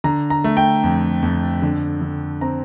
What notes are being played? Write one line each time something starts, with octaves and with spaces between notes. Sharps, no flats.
D3 A#5
A#5
A3
G5
F2
F2
D3
D3
C4 A#5